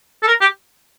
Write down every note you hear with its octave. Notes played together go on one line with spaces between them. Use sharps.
A4
A#4
G4